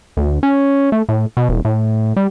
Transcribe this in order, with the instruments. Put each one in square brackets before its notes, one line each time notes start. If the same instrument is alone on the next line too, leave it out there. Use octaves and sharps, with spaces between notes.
[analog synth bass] D2
C#4
A3
A2
B2
E1
A2
G3